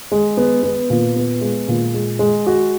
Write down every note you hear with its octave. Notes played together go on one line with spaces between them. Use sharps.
G#3
B3
B3
A#2
B3
G#3
A#2
G#3
G#3
F#4